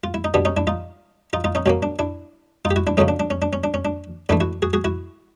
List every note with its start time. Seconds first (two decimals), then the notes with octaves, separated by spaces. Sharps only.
0.04 F4
0.14 E4
0.24 D#4
0.34 B2 G3 B3 D4
0.45 C#4 D#4
0.57 D4 E4
0.67 D#4 F4
1.33 D#4 F4
1.44 D#4 F4
1.55 C#4 D#4
1.66 B2 F#3 A#3 C#4
1.83 D4
1.99 D4 E4
2.65 D#4 F4
2.71 G4
2.76 E4 F#4
2.87 D4 E4
2.97 F2 C#3 F#3 A3 C#4 D#4
3.08 D4
3.20 D4
3.30 C#4
3.42 D4
3.53 C#4
3.64 D4
3.74 C#4
3.85 D4
4.29 G#2 E3 A3 D4 E4
4.40 E4 F#4
4.62 F#4 G#4
4.73 F#4 G#4
4.84 E4 F#4